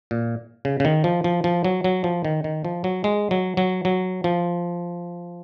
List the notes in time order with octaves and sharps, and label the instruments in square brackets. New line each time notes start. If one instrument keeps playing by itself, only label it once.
[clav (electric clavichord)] A#2
C#3
C#3
D#3
F3
F3
F3
F#3
F#3
F3
D#3
D#3
F3
F#3
G#3
F#3
F#3
F#3
F3